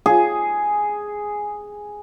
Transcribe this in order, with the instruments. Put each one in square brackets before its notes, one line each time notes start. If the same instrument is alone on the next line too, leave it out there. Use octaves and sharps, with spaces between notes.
[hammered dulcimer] G#4